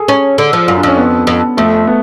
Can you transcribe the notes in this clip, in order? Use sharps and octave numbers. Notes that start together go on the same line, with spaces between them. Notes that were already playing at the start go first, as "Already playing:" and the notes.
Already playing: G#4 A4
C#4
D3
F3
F#2 F4
D4
F2 C#4
B3
F2
F2 A3
B3